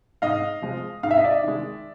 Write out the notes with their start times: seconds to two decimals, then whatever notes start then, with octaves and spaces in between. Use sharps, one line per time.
0.22 G#2 D#5 F5
0.62 F3 G#3
1.03 G#2 F5
1.11 E5
1.18 D#5
1.24 D5 E5
1.44 D#3 G#3